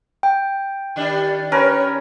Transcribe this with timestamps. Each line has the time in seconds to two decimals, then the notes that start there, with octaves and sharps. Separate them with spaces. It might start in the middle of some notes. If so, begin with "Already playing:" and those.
0.23 G5
0.96 D#3 G3 D4
1.52 C#4 A#4 B4 C#5